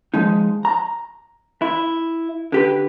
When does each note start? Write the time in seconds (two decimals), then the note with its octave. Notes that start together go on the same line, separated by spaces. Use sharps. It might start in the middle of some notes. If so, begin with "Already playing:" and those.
0.14 F3 G#3 D#4
0.65 A#5
1.62 E4
2.52 D3 G4 B4